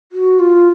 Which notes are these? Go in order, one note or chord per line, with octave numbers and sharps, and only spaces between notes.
F#4
F4